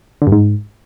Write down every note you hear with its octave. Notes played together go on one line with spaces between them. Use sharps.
D3
G2
G#2